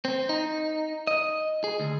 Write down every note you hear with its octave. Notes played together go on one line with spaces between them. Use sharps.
C4
D#4
D#5
G#4
D2